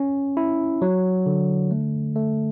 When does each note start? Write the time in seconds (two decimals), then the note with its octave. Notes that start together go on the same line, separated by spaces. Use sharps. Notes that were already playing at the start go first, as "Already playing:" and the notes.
Already playing: C#4
0.37 E4
0.82 F#3
1.26 D3
1.71 A3
2.16 A3